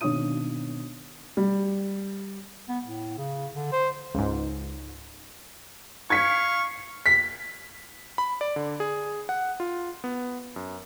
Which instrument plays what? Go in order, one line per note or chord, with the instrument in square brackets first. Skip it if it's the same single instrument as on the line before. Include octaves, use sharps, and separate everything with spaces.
[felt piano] G#1 B2 D4 C#5 D#6 D#7
[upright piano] G3
[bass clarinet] B3
A2
C#3
D3
C5
[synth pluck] C#2 G#2
[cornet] F5 [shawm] C#6 [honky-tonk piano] G#6 B6 C#7
[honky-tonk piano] B6
[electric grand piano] B5
D5
D3
G#4
F#5
F4
B3
F#2